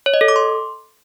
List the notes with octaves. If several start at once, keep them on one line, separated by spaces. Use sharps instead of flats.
C#5
D#5
A4
D6
C6